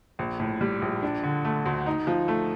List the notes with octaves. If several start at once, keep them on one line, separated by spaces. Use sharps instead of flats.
A#1
A2
G3
A#1
D4
D3
A3
D2
D#4
F3
A3